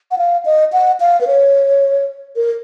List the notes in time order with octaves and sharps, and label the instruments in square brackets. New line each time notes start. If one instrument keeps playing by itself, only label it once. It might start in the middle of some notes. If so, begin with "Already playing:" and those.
[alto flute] F#5
F5
D#5
F#5
F5
B4
C#5
A#4